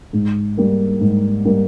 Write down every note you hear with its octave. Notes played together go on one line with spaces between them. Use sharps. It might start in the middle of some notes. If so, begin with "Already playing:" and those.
G#2
G3 A#3
G#2
G3 A#3